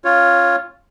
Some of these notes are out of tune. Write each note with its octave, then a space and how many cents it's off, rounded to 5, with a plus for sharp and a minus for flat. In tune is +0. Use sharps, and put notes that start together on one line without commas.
C#4 -35 F4 +0 C#5 +0